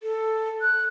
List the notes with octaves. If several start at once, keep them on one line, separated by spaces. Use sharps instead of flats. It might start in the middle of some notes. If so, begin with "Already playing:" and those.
A4
F#6